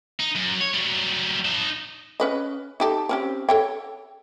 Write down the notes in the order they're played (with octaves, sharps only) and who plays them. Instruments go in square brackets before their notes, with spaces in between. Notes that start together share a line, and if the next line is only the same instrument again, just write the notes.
[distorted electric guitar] D#4
F#2
C#5
F#3 G3
D#4 A5
[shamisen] C#4 B4 D#5
D#4 G4 A4
C4 C#4 G4
A4 C#5 G5